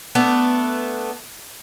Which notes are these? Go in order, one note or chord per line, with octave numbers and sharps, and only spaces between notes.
A3 B3 D4